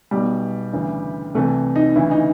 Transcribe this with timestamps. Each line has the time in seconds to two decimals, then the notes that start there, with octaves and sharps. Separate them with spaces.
0.11 B1 B2 G3
0.73 D2 C#3 E3
1.35 C2 C3 E3 A3
1.76 D#4
1.96 D2 C#3 E3 E4
2.11 D#4